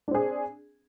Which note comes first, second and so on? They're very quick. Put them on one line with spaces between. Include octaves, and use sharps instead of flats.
D4 C4 G#4